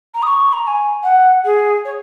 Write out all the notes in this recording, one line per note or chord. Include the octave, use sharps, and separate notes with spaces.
A#5
D#6
C#6
A#5
A#5
G#5
F#5
G#4
C#5